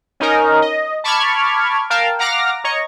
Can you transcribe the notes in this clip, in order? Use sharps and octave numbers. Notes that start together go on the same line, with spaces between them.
C#4 D#4 A#4 D#5
D#5
A5 B5 C#6 D6 F6 G#6
A#4 F5 G5 A5
F5 F#5 A#5 D6 F6 A#6
C#5 D#5 A#5 C#6